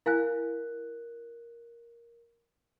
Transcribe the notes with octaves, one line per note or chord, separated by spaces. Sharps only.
E4 A#4 F5 G#5 F#6